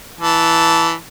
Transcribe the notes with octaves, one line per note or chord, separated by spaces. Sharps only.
E3 A5